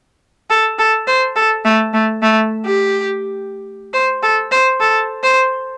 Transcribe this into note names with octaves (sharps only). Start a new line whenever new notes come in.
A4
A4
C5
A4
A3
A3
A3
G4
C5
A4
C5
A4
C5